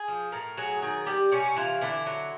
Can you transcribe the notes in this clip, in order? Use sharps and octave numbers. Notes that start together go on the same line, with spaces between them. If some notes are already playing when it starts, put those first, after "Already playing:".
Already playing: G#4
F3
A2 A#4
F#3 G#4
D#3 G#4
G3 G4
C3 C#4
E3 F4
D3 E4
F#3